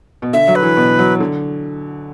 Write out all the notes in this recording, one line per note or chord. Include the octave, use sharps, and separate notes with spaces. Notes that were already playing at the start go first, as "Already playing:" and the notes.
B2
D3 E5
F#3
B4
E3
B2
F#3
D3